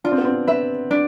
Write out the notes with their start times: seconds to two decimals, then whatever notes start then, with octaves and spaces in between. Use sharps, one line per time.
0.04 D4 F4
0.12 C4
0.18 B3
0.25 C4
0.48 B4 E5
0.91 D4